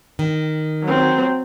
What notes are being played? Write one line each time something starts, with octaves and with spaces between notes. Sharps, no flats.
D#3
F#3 C4